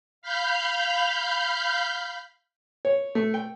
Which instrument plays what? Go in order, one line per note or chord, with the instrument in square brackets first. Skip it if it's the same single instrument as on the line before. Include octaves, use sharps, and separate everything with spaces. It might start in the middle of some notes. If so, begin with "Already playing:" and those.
[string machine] F5 B5 F6 G6
[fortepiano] C#5
A3
G5